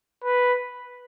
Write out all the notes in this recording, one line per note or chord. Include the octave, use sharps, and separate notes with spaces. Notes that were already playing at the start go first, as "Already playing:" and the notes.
B4